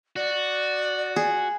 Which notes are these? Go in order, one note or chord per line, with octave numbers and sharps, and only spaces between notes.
F#4 D5
G#4